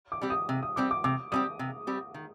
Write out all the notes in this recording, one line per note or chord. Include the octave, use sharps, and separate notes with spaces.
D6
G3 C4 G4
D#6
C3
D#6
G3 C4 G4 D6
D6
C3 D6
G3 C4 G4 D#6
C3
G3 C4 G4
D#3